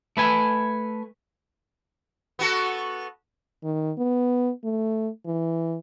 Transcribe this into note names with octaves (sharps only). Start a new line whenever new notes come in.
A3 B4 G#5
B3 F#4 A4
D#3
B3
A3
E3